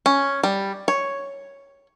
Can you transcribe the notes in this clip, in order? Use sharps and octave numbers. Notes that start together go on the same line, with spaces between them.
C#4
G3
C#5